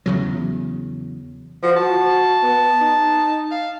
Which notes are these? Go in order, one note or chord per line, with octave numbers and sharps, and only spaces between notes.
E2 C#3 F#3
F3 F#4
F#4 A5
B3
D#4
F5